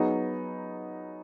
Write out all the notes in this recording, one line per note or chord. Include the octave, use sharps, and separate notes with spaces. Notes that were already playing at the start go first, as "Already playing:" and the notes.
Already playing: F#3 B3 D#4 G#4